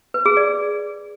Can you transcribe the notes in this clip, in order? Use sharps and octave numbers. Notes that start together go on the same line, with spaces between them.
B4
G#4
D5